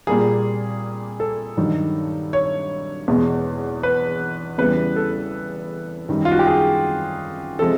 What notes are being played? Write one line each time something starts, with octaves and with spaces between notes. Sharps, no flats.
A#2 G3 A#3 G#4
A4
G2 D#3 F#3
C#5
E2 B2 G#3
B4
E2 C#3 E3 G3 B3 B4
A4
F#2 D#3 G3
F4
F#4
G4
G#4
C3 F3 G#3 A4